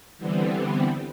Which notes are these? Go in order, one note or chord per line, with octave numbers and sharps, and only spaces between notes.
D3 E3 G3 B3 C4